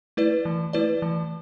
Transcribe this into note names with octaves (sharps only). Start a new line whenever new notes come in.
A3 E4 B4 D5
E3
A3 E4 B4 D5
E3